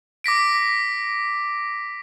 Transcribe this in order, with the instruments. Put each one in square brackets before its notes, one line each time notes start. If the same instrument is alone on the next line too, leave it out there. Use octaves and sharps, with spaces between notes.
[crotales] D6 A#6 B6 D7